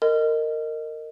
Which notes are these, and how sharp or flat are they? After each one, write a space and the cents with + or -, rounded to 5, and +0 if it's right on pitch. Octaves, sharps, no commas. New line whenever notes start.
A#4 -20 D#5 -5